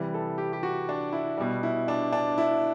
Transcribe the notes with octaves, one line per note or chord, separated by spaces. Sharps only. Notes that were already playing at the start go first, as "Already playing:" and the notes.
Already playing: C3 E3 G3
A4
G4
G4
F#4
D4
E4
B2 G3
E4
D4
D4
E4